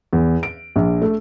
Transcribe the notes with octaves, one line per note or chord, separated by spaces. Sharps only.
E2
D7
A#1
A3